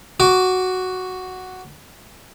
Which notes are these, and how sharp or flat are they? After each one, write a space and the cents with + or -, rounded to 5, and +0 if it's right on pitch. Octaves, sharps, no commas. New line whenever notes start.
F#4 +0 D6 -15